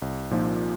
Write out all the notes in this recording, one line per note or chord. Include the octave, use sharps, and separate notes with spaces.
C2
A#2 F3 A#3 D#4